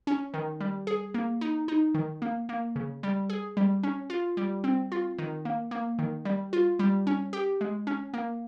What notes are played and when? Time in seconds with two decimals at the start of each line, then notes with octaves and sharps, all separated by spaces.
0.07 C#4
0.34 D#3
0.60 G3
0.87 G#4
1.14 A#3
1.41 D#4
1.68 D#4
1.94 D#3
2.22 A#3
2.49 A#3
2.76 C#3
3.03 G3
3.30 G#4
3.57 G3
3.83 C#4
4.10 F4
4.37 G3
4.64 C4
4.92 F4
5.18 D#3
5.45 A#3
5.71 A#3
5.99 D#3
6.25 G3
6.53 F4
6.79 G3
7.07 C#4
7.33 G4
7.61 G#3
7.87 C#4
8.14 A#3